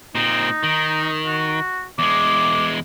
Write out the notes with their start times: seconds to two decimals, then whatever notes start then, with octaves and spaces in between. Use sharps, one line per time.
0.15 A#2 C4 D#4
0.63 D#3
1.26 F#4
1.99 E2 G#3 D6